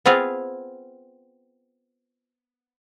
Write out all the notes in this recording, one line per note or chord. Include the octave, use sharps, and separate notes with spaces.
B3 C4 F4 G#4